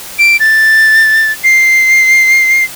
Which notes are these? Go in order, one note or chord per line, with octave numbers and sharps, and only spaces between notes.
D7
A6
C7